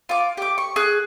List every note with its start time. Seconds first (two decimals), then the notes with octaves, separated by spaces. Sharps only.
0.09 F4 D6
0.37 G4 D6
0.58 C#6
0.76 G#4 F#6